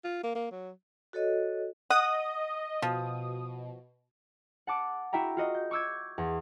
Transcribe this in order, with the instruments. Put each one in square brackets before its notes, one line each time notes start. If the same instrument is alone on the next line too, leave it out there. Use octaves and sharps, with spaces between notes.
[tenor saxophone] F4
A#3
A#3
F#3
[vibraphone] F#4 A4 C#5 D#5
[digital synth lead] D#5 [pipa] F#5 [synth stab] D#6
[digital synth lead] B2 [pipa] F3
[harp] F#5 A5 D6
E4 F#4 E5 G5 A#5
F4 F#4 D#5
G6
C#6 D6 E6 G6 G#6
E2